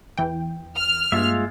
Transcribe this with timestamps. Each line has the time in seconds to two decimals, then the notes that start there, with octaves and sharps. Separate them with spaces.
0.18 E2 E3 G5
0.75 F6
1.12 G2 G#3 A#3 F4 E5